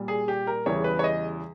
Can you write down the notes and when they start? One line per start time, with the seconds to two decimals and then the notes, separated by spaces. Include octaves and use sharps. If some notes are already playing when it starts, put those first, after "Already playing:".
Already playing: A#2 G3
0.08 G#4
0.28 G4
0.47 A#4
0.66 E2 C#3 E3 G3 C#5
0.84 B4
0.99 C#5
1.04 D#5